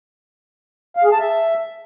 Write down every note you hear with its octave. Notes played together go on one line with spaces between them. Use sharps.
F5
G#4
A5
E5